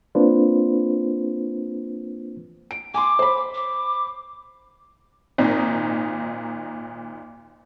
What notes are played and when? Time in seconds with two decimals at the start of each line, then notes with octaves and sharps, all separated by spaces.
0.15 A#3 C4 D4 F4 B4 C5
2.71 D7
2.94 G#5 C6 D6
3.19 C5 B5
3.55 D6
5.38 G#1 A#2 D#4